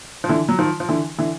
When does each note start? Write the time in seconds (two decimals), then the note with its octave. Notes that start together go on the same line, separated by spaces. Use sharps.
0.24 F3
0.29 D3 E3
0.49 F#3
0.59 D#3 F3
0.80 F3
0.89 D3 E3
1.18 D3 E3